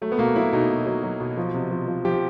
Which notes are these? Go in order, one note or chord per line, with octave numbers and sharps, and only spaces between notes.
F#3 A3
B3
B2 A#3
F#3 E4
B2 D#4
B2
F#3
F#3
B2
F3
C3
F3
F3
F3 G4